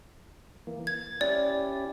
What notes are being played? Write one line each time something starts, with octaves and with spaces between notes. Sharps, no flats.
E3 A#3
G#6 A6
C#4 E4 G4 D5